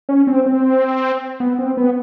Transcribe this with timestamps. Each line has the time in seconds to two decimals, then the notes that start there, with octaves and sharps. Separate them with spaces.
0.09 C#4
0.27 C4
0.46 C4
1.40 B3
1.59 C4
1.77 B3